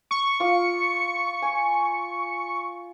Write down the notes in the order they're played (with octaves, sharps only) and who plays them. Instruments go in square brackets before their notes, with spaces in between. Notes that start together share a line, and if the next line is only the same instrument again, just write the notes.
[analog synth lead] C#6
[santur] F4 D6
G#5